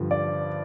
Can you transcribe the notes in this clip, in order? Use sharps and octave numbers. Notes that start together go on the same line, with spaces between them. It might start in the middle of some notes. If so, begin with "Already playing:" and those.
Already playing: G2 D3 F3
D5